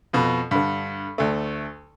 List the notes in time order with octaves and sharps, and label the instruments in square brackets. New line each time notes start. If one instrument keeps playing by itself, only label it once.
[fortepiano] F2 B2
G2 D3
D2 A3